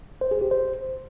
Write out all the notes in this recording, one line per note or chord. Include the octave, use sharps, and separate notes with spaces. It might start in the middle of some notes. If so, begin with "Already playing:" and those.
C5
G#4
G4
C5